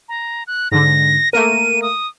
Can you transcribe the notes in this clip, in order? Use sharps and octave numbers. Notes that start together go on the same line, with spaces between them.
A#5
F#6
G#2 D3 A#6
A3 A#3 A#4 D#7
D#6